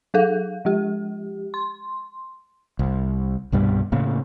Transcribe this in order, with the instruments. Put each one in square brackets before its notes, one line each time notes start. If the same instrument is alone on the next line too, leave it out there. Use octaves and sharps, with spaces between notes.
[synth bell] F#3 G#4 A4 F5
F3 G#3 G4
C6
[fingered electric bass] C2
C2 G2 B2 G3
A2 C#3 A#3